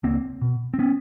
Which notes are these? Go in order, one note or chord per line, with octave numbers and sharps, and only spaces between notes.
C#2 A#3 C4
B2
C4
B3 C#4